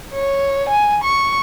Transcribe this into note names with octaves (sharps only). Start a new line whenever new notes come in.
C#5
G#5
C#6